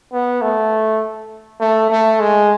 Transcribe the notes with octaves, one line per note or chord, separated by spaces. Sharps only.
B3
A3
A3
A3
G#3